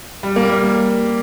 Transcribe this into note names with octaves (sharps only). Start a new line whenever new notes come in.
G3
A#3
G3